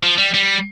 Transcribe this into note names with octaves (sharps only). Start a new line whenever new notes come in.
F3
G3
G3